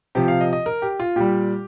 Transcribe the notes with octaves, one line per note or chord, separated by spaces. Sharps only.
C3 F3 G4
F5
D#5
D#5
A#4
G4
F4
A#2 G3 G4